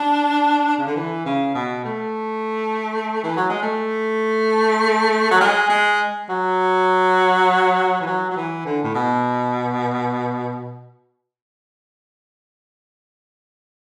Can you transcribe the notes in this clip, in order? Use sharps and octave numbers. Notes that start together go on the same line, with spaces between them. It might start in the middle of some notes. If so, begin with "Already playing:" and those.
Already playing: D4
C#3
D3
E3
C#3
B2
A3
E3
F#3
G#3
A3
F#3
G#3
G#3
F#3
E3
F#3
F#3
E3
D3
A2
B2